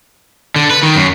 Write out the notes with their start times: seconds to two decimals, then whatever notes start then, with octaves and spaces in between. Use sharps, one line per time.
0.56 D3
0.71 B4
0.83 D#3
0.96 F#2